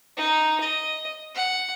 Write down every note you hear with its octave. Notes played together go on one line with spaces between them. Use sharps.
D#4
D#5
F#5